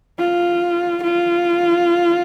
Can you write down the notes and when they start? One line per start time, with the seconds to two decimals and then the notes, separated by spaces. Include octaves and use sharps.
0.19 F4
1.03 F4